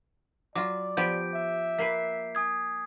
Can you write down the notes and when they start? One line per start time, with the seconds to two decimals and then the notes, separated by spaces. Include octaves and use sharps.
0.56 F#3 F4 D5 D6
0.97 F3 B3 G4 G6 D7
1.34 E5
1.79 A#3 B4 B6 C7
2.35 G#5 D#6 G#6